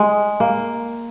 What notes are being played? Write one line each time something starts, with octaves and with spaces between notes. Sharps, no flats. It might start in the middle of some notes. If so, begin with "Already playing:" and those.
Already playing: G#3
A#3